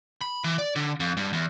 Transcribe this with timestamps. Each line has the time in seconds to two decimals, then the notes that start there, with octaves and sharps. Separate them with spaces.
0.21 B5
0.44 E3
0.58 D5
0.76 D3
1.00 F2
1.17 G2
1.33 E2